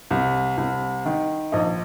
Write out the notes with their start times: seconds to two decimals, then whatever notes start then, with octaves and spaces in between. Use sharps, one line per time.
0.11 C2
0.57 C2
1.06 D#3
1.52 A#1 D#4